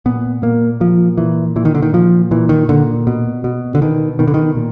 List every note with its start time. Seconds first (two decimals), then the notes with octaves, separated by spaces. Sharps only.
0.06 A#2 B3
0.42 A#2 A#3
0.80 A#2 F3
1.17 A#2 E3
1.56 A#2 E3
1.65 D#3
1.75 D3
1.82 D#3
1.93 A#2 F3
2.31 A#2 E3
2.49 D#3
2.69 A#2 D3
3.07 B2
3.44 B2
3.75 D3
3.82 B2 D#3
4.19 B2 D#3
4.27 D3
4.34 D#3
4.57 A#2